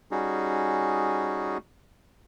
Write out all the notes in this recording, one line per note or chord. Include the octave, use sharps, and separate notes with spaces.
G3 C#4 D#4 F#4 G#4